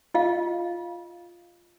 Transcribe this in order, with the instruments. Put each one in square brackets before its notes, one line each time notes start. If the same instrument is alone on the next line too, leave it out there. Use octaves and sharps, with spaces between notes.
[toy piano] F4 D#5 F5